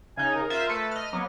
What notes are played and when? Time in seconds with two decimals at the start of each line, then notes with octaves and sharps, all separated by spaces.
0.17 C#3 D#4 G#5
0.34 A#4
0.50 F4 C5 E5
0.69 A3 A4 B4
0.91 D#5 F6
1.13 F#3 A#3 B3